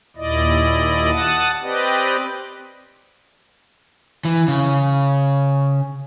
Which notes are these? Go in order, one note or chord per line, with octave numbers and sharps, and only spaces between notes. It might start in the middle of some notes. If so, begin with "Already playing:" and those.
D#2 A#2 E4 D5 D#5
F#5 A5 D#6
C4 G4 B4 D5 D#5
E3
C#3